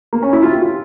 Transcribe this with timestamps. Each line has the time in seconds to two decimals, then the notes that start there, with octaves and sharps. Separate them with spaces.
0.13 A#3
0.23 C#4
0.33 E4
0.43 F4
0.51 G4
0.62 F4